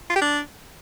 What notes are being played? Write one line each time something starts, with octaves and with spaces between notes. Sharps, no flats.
F4
G4
D4